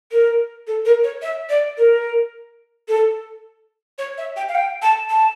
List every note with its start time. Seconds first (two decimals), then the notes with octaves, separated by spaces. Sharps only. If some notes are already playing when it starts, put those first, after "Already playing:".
0.12 A#4
0.67 A4
0.85 A#4
1.04 C#5
1.22 E5
1.50 D5
1.77 A#4
2.88 A4
3.98 C#5
4.18 E5
4.37 G5
4.49 F5
4.55 G5
4.82 A5
5.10 A5